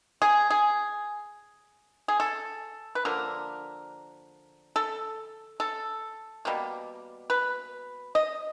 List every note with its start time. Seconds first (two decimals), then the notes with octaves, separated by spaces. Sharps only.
0.22 G#4
0.50 G#4
2.08 G#4
2.20 A4
2.95 B4
3.05 D3 F3 A#3 A#4
4.76 A4
5.60 A4
6.45 B2 G3 A#3
7.30 B4
8.15 D#5